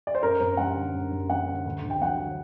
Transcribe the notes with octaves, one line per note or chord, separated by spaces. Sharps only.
D5
C5
F#2 A#4
F#2 C5
G3 F#5
D3
F#2
F#2
G3 F#5
D3
D2
D2
G5
F#3 F#5
D3